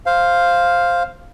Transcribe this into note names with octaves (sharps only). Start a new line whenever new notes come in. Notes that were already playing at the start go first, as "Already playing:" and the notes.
C5 F5